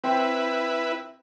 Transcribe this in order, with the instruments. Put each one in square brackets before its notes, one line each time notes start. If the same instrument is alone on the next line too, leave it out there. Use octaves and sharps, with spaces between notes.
[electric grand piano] C4 G5 C6 [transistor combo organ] E4 B4